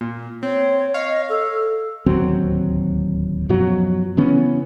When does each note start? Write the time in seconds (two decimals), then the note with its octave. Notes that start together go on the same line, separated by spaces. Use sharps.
0.01 A#2
0.43 C4 C#5
0.94 C#5 D#5 F5
1.29 A4
2.06 D1 D#2 F#3 C4
3.49 F#2 B2 F3 F#3
4.17 C#3 E3 B3 C#4